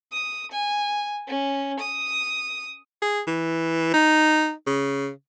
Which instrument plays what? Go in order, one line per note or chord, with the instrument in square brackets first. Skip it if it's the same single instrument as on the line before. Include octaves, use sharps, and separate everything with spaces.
[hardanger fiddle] D#6
G#5
C#4
D#6
[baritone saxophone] G#4
E3
D#4
C#3